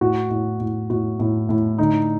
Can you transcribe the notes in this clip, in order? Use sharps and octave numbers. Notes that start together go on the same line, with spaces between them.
A2 F#4
A2
A2
A2 F#4
A2
A2
D3 D#4